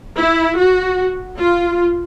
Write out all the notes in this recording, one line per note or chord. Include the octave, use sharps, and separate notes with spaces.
E4
F#4
F4